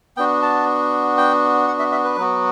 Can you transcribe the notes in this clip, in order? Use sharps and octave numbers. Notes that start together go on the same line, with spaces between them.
B3 D4 F#4 G5
A5
G5
F#5
E5
E5
B4
F#3 B3 F#4